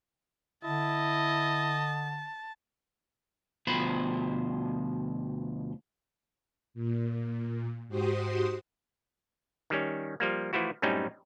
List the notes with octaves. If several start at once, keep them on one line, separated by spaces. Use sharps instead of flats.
D3 E4 D#5 A5
D2 B2 F3 C5 B5
A#2
G#2 F#4 G4 C5 C6 D#6
D#3 G3 C#4
F3 G3 A#3
E3 F3 A3 E4 F#4
F#2 A2 G3 C4 C#4 D#4